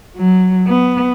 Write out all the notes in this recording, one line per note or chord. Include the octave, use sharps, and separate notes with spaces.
F#3
B3